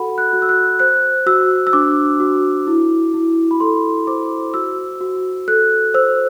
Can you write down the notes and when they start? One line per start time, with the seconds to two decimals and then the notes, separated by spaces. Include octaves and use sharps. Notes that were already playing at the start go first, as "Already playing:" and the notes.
Already playing: F#4 A4 F#5 B5
0.18 F#6
0.33 F#4
0.42 E6
0.49 F#6
0.79 C5 F#6
1.27 F#4 E6
1.67 E6
1.73 D4 D6
2.20 F#4
2.67 E4
3.14 E4
3.51 B5
3.60 A4 C6
4.07 C5 D6
4.54 F#4 E6
5.01 F#4
5.48 A4 F#6
5.94 C5 E6